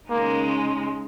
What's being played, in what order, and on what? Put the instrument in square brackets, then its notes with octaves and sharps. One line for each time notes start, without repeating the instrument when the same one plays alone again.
[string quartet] C#3 G#3 D#4 [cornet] A#3